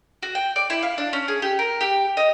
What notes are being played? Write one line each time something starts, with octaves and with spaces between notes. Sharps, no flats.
F#4
G5
D5
E4
F5
D4
C#4
G#4
G4
A#4
G4
D#5